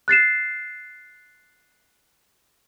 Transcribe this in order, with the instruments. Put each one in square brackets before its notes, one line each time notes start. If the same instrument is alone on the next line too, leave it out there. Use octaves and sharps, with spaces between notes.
[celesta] F#6 A6 C7 E7